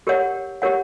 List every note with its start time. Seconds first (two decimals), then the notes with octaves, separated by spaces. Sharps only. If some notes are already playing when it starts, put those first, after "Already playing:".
0.07 G4 A#4 C#5 F#5
0.62 G4 A#4 C#5 F#5